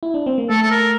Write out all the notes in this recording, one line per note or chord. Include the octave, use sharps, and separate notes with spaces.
E4
D4
C4
A#3
A3 A4
A4
A#4